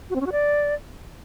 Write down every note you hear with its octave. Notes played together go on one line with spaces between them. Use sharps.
F#4
C4
C#4
F#4
D5